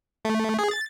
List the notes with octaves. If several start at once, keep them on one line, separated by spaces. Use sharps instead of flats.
A3
G#4
A6